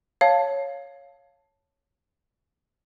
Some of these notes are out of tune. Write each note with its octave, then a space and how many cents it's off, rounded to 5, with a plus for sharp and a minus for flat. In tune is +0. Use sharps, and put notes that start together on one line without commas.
C#5 +0 F5 +0 A5 +0